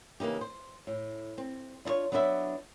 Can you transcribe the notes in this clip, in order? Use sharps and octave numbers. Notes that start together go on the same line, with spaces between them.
C#3 E3 A#3 D#4 G4
C5
A2
C4
D4 E4 F4 C#5
F#3 B3 D4 E4 B4 E5